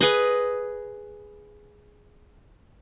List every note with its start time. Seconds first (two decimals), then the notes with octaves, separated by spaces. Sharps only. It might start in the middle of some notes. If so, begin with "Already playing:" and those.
0.01 G#4 B4 D#5